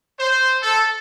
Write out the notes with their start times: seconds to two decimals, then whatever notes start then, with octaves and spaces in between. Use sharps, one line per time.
0.19 C5
0.62 A4